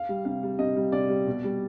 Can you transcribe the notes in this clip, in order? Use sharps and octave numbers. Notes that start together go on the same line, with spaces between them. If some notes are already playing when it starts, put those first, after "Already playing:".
Already playing: F5
G3
C3 F5
G3
C3 D#5
G3
C3 D5
G3
B2
G3